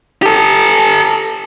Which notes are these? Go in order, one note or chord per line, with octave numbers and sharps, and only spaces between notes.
G4 A4